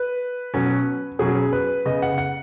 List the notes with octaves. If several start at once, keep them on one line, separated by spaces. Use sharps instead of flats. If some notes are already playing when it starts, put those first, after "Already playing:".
Already playing: B4
B2 F#3 C#4
B2 F#3 C#4 G#4
B4
C#3 B3 D#5
F#5
F#5